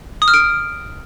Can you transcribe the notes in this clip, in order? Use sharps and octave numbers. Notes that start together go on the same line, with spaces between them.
D#6
F6
D7